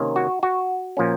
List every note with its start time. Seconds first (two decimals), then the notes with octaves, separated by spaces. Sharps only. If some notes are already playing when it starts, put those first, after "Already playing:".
Already playing: C3 D#3 A#3 C#4
0.16 F#4
0.43 F#4
0.97 A#2 F3 A#3 C#4